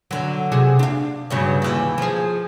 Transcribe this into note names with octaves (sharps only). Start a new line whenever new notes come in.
D3 F#3
C3 F#4 G#4
D4 F5
G2 C#3 F#3
D#2 E3
F3 G#4